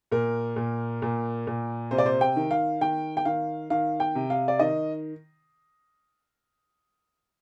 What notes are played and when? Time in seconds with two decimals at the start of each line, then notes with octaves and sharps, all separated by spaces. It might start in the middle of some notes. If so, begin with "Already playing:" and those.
0.12 A#2 A#4
0.56 A#2
1.02 A#2
1.47 A#2
1.91 C3 C5
1.98 D5
2.06 C5
2.21 G5
2.36 D#3
2.51 F5
2.81 D#3 G5
3.17 G5
3.25 D#3 F5
3.70 D#3 F5
4.00 G5
4.15 C3
4.30 F5
4.48 D5
4.59 D#3 D#5